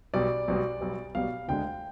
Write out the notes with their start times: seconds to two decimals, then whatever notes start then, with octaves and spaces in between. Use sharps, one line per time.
0.14 B1 B2 G3 D5
0.48 B1 B2 G3
0.81 B1 B2 G3
1.15 B1 B2 G3 F5
1.48 D2 D3 G#3 G5